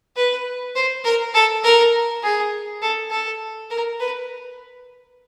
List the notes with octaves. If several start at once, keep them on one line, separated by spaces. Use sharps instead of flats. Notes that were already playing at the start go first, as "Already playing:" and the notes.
B4
C5
A#4
A4
A#4
G#4
A4
A4
A#4
B4